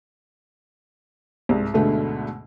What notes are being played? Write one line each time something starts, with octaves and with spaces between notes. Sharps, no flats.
C2 G#2
D2 G#2 B2 D3 A3